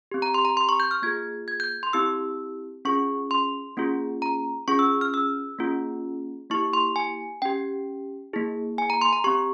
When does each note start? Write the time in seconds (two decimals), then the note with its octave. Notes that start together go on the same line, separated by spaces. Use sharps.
0.11 C4 G4
0.22 A#5
0.34 C6
0.45 A#5
0.57 C6
0.69 C#6
0.80 G6
0.91 F6
1.02 A#3 F4 G#4 G#6
1.48 G#6
1.60 G6
1.83 C6
1.93 C4 E4 G4 E6
2.85 C#4 F4 G#4 C#6
3.31 C6
3.77 A#3 C#4 F4 G#4
4.22 A#5
4.68 C#4 F4 G#4 C#6
4.79 E6
5.01 F6
5.14 E6
5.59 A#3 C#4 F4 G#4
6.50 A#3 E4 G4 C#6
6.73 C6
6.96 G#5
7.42 C#4 G4 G5
8.33 A#3 E4 G#4
8.78 G#5
8.90 A#5
9.01 C6
9.13 A#5
9.24 C4 G4 C#6